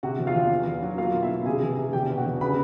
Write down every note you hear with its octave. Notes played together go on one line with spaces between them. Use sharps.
C3 F#4 F#5
E2
F4 F5
E2
E2
E2
F#3
A#3 F4 F5
B2
E4 E5
B2
C3 G#4 G#5
E3
C3
E2 G4 G5
B2
F#4 F#5
E2
C#3 B4 B5